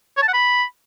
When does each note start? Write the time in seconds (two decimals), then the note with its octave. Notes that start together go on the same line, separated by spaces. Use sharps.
0.17 C#5
0.23 A5
0.28 F#5
0.34 B5